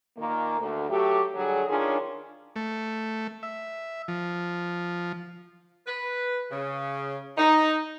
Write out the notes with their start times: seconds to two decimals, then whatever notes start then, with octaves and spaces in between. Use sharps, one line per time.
0.17 A#2 D#3 A#3
0.59 D2
0.89 F#3 A3 G4
1.35 D3 F#3 G3 G#4
1.67 D#3 C#4 D4 F4 G#4
2.56 A3
3.43 E5
4.08 F3
5.87 B4
6.51 C#3
7.38 D#4